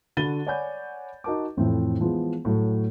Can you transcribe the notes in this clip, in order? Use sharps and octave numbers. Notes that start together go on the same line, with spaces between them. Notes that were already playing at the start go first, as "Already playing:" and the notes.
D3 F#4 B5 A6 D#7 G7
C#5 D5 F#5 G#5 B5 G6
D#4 F#4 A#4 A5 D6
F2 A2 E3 F3 C4
E3 F3 G#3 B3 F4
A2 F#3 A3